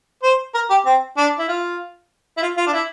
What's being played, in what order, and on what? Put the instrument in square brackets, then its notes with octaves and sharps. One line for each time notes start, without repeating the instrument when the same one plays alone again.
[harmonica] C5
A#4
G4
C4
D4
E4
F4
E4
F4
F4
D4
E4